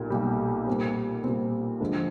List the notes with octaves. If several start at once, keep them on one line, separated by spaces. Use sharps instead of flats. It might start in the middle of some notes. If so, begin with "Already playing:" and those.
Already playing: B1 A#2 G3
B1 A#2 G3
A#2 G3 C4
A#2 G3 C4
D2 D3 F3 G#3